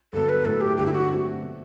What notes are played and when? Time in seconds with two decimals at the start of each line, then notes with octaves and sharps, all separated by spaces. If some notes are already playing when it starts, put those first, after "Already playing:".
0.13 G2 D3 F#3 B3 A4
0.29 B4
0.45 A2 F#3 A3 A4
0.61 G4
0.77 G2 D3 F#3 G4
0.86 E4
0.93 F#4
1.09 F#3 A3 C4 F#4
1.42 B2 A3